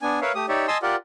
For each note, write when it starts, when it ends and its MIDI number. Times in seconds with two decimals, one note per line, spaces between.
0.02 0.20 59
0.02 0.20 62
0.02 0.20 80
0.21 0.32 70
0.21 0.32 71
0.21 0.32 73
0.21 0.32 76
0.21 0.32 77
0.35 0.46 57
0.35 0.46 67
0.35 0.46 87
0.49 0.66 63
0.49 0.66 67
0.49 0.66 73
0.49 0.66 74
0.49 0.66 76
0.68 0.78 75
0.68 0.78 80
0.68 0.78 81
0.68 0.78 84
0.68 0.78 87
0.68 0.78 88
0.82 0.96 65
0.82 0.96 67
0.82 0.96 70
0.82 0.96 74
0.82 0.96 78